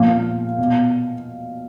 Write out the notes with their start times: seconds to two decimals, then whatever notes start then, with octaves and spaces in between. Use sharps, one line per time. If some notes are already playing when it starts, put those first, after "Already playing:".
Already playing: A#2 F3 F5
0.58 B2